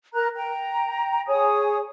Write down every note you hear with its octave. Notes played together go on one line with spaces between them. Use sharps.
A#4 A#5 F#6
G5 A#5
G#4 C#5 G#5 D#6